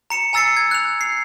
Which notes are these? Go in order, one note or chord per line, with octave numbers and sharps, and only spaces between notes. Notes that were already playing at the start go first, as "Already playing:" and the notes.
A#5 C#7 E7
G#5 A#5 E6 A6 C7 C#7
G#6
F#6 F7
C7